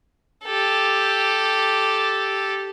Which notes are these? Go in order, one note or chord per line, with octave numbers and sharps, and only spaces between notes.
G4 A4